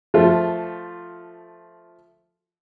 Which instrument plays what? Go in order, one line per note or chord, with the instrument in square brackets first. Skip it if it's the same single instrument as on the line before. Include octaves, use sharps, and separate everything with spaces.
[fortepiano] F3 A3 F4